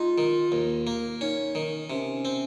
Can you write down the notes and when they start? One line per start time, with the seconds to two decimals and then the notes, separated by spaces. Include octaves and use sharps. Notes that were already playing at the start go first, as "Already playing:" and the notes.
Already playing: G#3 D#4 F4
0.18 D#3
0.52 D#2
0.87 A#3
1.21 C#4 D#4
1.55 D#3
1.90 C3 C#4
2.25 C4